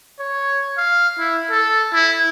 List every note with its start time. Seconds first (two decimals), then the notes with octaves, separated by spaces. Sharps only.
0.19 C#5
0.77 F5
1.19 E4
1.51 A4
1.93 E4